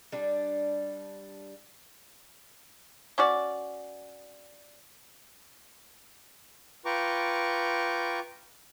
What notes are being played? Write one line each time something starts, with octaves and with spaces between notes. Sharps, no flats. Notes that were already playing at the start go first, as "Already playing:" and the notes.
G3 D4
C#4 F#4 D5
F4 B4 G5 A#5 C#6 D6